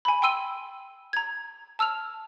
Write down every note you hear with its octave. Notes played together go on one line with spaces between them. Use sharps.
G#5 B5
G5 C6 E6 D#7 G7
A#5 G#6
A5 E6 F6 F7